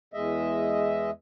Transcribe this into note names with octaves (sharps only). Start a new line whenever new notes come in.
E2 G#3 D#5 E5